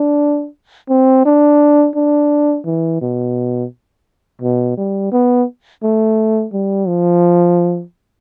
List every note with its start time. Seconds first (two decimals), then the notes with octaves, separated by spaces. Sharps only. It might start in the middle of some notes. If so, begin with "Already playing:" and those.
Already playing: D4
0.89 C4
1.25 D4
1.96 D4
2.65 E3
3.01 B2
4.42 B2
4.77 G3
5.12 B3
5.83 A3
6.53 G3
6.88 F3